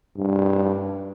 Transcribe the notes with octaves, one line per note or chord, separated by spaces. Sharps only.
G2